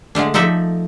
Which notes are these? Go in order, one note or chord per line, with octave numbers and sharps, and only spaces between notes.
D3 G#3 A3 D4
F3 D#4 A4 D5 E5